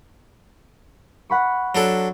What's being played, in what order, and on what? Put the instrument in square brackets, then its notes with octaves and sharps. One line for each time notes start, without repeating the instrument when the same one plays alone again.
[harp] F#5 B5 C#6
[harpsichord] F#3 D4 A4